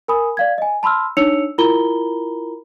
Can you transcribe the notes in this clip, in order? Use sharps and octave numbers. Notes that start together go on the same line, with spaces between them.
A#4 G#5 B5 D#6
D5 F5 G#6
D#5 G#5
A5 B5 C6 E6 F6
D4 D#4 C#5 E6 C#7 F7
E4 F4 A#4 A#5 B5 G7